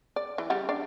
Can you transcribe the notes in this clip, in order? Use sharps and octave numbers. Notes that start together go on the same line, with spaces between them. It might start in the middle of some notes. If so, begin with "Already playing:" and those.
D5
E3
C#3 G3 F#5
D4 D5